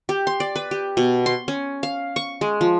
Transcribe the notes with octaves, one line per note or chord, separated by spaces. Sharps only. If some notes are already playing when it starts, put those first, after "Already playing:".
G4
C6
D5
B4
G4
B2
C6
C#4
F5
C#6
G#3
F3